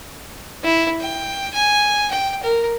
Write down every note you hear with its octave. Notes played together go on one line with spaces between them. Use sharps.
E4
G5
G#5
G5
A#4